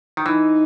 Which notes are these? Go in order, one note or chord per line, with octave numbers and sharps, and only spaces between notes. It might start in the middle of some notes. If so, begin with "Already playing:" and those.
D#3
E3 D#4